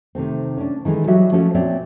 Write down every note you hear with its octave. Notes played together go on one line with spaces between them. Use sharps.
C3 D#3 A3 C4
C#4 D4
D#3 E3 G#3 G#4 A4
F#3 G3 F#4 G4 D#5 E5
F3 A3 C#4 F#4 C#5
A#2 C4 C#5 D5 E5